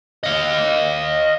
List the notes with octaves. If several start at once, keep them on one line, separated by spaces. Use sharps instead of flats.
D#5 F5